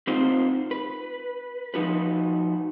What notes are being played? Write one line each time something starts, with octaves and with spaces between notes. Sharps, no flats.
C4 D#4 F4 C5
B4
F3 D#4 F#4 B4